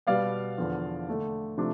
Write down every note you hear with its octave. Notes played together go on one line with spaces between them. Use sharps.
B2 G3 B3 D5 F5
E2 D3 F3 B3
D3 A3 D4
C3 F3 A3 D4